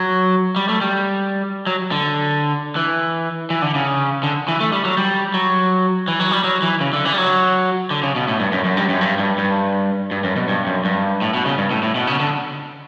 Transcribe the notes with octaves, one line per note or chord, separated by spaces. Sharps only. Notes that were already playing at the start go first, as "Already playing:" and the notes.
Already playing: F#3
G3
A3
G3
F#3
D3
E3
E3
D3
C#3
D3
E3
A3
G3
F#3
G3
F#3
E3
F#3
G3
F#3
E3
C#3
D3
E3
G3
F#3
D3
C#3
B2
A2
G2
F#2
F#2
G2
F#2
G2
G2
G2
G2
F#2
B2
G2
F#2
G2
A2
B2
C#3
G2
A2
A2
B2
C#3
D3